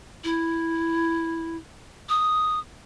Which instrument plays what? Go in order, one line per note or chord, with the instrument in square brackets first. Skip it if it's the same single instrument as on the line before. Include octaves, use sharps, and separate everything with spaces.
[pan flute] E4
D#6